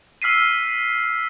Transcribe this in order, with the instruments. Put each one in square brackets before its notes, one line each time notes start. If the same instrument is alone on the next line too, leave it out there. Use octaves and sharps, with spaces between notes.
[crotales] E6 F6 B6 C7 D#7